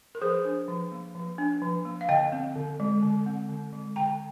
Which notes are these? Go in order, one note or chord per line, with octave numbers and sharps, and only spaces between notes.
A#4
F3 G#4 C5
D4
F3
A#3
F3
D4
F3
A#3
F5
D3 D#5 G5
C4
D3
G#3
D3
C4
D3
G#3
D3 G5 A#5